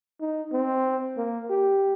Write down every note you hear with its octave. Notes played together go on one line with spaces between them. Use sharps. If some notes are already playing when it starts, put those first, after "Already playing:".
D#4
C4
A#3
G4